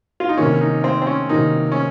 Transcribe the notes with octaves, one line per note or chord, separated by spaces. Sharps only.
F4
D#4
C3 D#3 A#3 C#4
D#4
C4
C4
C#4
C3 D#3 A#3 D#4
C#4